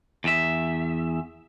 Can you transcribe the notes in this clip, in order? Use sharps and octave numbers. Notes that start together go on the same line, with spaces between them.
E2 E5